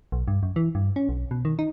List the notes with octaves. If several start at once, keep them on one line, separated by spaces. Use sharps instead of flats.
B1
G2
F#2
E3
G2
C#4
B1
B2
D#3
D#4